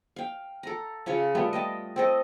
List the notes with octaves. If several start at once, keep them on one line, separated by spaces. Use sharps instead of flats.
F5 G5
A4 A#5
C#3 F4 C#5
G3 A3 B3 F4
D#5 G5 A5
C4 A4 D#5